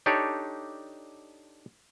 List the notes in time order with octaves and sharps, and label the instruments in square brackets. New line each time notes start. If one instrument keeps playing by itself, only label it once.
[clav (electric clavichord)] D4 D#4 G4 A4 C#5 D5